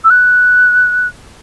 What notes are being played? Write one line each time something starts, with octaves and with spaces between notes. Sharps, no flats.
E6
F#6